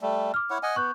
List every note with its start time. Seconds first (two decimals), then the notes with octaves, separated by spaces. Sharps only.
0.01 G3 A3
0.34 D6 F6
0.50 E4 C#5 F#5
0.63 D#5 F#5 G#5
0.76 B3 C#6 F#6 G6